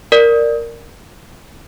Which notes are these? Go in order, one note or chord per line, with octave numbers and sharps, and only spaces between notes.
A#4 D5